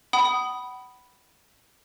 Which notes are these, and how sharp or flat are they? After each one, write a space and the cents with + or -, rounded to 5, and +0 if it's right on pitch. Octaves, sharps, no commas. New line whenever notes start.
F#5 +35 B5 +0 D#6 +0